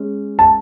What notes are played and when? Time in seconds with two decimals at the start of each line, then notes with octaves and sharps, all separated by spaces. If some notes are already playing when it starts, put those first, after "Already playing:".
Already playing: G#3 C#4
0.39 A5